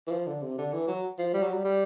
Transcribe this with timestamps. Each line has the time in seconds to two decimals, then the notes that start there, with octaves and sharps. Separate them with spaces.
0.07 E3
0.11 F3
0.27 D3
0.42 C3
0.58 D3
0.73 E3
0.88 F#3
1.19 F3
1.34 G3
1.43 F#3
1.54 G3
1.64 G3